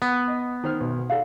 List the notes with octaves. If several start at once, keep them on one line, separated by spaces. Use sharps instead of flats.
B3
D#5
D#3 C5 F6
B1
A4 D5 F5 F#5